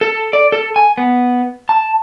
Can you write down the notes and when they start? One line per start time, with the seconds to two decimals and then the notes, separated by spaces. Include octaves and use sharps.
0.01 A4
0.33 D5
0.52 A4
0.76 G#5
0.98 B3
1.69 A5